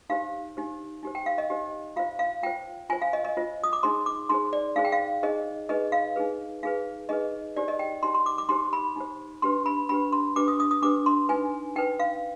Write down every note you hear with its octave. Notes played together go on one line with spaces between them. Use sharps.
D#4 G4 C5 F5
D#4 G4 C5
D#4 G4 C5
G5
F5
D#5
D#4 G4 C5
F4 C5 F5
F5
F4 C5 G5
F4 C5 G#5
F5
D#5
D#5
F4 C5
D#6
D6
D#4 G#4 C5 C6
D6
D#4 G#4 C5 C6
D5
D#4 G#4 C5 F5
G5
F5
D#4 G#4 C5 D#5
D#4 G#4 B4 D#5
F5
D#4 G#4 B4
D#4 G#4 B4 F5
D#4 G#4 B4 D#5
D#4 G4 C5 D5
D#5
G5
D#4 G4 C5 C6
C6
D6
D6
D#4 G4 C5 C6
B5
D#4 G4 C5
D4 G4 B4 C6
B5
D4 G4 B4 B5
C6
D4 G4 B4 D6
D#6
D#6
D#6
D4 G4 B4 D6
C6
D#4 B4 G#5
D#4 B4 G5
F5